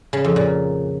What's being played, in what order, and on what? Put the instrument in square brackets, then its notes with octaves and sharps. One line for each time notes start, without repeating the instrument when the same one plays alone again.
[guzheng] C#3
F2
A#2